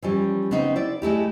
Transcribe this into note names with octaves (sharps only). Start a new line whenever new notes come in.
E3 F3 G3 C#4
C#3 B3 C4 D#4
E4 D5
G#3 A3 E4 G4